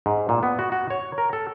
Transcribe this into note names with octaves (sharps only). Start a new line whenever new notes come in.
G#2
A#2
B3
F#4
F#4
C#5
A#4
A4